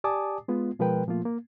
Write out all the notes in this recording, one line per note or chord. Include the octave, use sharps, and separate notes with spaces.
G4 D5 G#5 A5 D6 D#6
G#3 B3 F4
B2 F3 G#3 A#4 B4 G5
A#2 F3 A3 A#3 F4
A#3